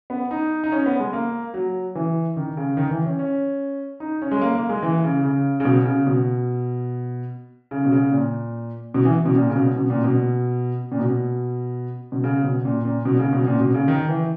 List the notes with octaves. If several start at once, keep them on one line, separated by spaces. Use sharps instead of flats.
B3
D#4
D#4
C#4
B3
G#3
A#3
F#3
E3
D#3
C#3
D#3
E3
C#4
C#4
D#4
C#4
G#3
A#3
A#3
G#3
E3
C#3
C#3
C#3
B2
C#3
B2
C#3
B2
C#3
A#2
B2
E3
B2
A#2
C#3
B2
B2
A#2
B2
A#2
B2
B2
C#3
B2
A#2
A#2
B2
C#3
B2
A#2
B2
C#3
D#3
E3